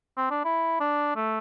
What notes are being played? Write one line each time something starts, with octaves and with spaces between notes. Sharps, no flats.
C4
D4
E4
D4
A3